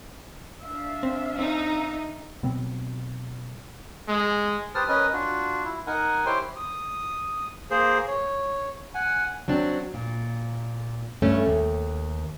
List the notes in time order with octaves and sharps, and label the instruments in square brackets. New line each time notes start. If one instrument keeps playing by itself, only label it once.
[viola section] D4 E5 F5
[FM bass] C4
[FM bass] C4 [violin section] D#4
[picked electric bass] B2 F#3 B3 C4
[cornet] G#3
[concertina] G4 B4 C5 A5 D#6 F6
C#4 A#4 B4 C#5 D#5
D4 F4 F#4
E4
D#4 A#4 F#5 G#5
E4 G4 C5 C#5 G5 C6
[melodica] D#6
A#3 G#4 C5
C#5
F#5 G#5
[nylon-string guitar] F#3 C4 D4
A#2
G2 A3 C#4
D#2